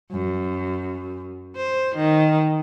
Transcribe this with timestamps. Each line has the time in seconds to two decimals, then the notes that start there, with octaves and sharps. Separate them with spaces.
0.12 F#2
1.56 C5
1.96 D#3